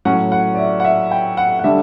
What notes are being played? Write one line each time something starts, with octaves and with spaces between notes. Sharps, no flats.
A2 F#3 C#4 F#5
F#5
D5
E5
F#5
E5
G5
F#5
F#5
D3 G3 D4 E5